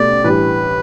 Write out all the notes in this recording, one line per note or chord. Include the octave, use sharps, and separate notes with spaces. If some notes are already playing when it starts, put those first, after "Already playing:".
Already playing: B2 A3 G4 D5
A2 E3 G3 D4 G4 B4